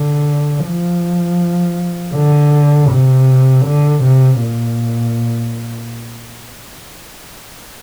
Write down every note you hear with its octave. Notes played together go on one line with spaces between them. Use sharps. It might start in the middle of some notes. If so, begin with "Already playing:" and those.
Already playing: D3
F3
D3
C3
D3
C3
A#2